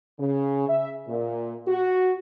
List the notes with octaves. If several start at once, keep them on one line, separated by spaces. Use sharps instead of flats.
C#3
E5
A#2
F#4